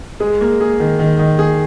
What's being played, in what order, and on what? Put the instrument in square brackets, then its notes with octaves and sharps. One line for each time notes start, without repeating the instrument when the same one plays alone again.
[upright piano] G#3 [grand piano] G#4
[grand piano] A#3
G#4
D#3
D#3
D#3
G#4